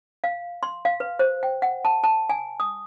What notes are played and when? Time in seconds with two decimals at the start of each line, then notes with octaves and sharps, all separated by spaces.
0.24 F5
0.63 C6
0.85 F5
1.00 B4
1.19 C5
1.43 G5
1.62 F#5
1.85 A5
2.04 A5
2.29 G#5
2.60 D#6